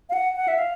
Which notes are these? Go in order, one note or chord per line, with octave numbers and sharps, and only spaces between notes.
F5
F#5
F#5
E5
F5